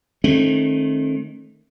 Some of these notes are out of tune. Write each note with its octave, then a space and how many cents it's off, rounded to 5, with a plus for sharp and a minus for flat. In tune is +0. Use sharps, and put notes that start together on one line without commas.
D#3 -15 A3 -15 C4 +45